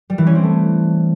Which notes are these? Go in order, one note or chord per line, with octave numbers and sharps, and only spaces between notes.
G3
E3
C#4
C4
A3